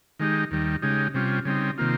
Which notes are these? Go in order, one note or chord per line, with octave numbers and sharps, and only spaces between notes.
D#3 G#3 D#4 G4
D#2 D#3 G3
C#3 G#3 D#4 G4
C3 G3 C#4 F4
C#3 G3 C4 D#4
C3 D#3 A#3 F4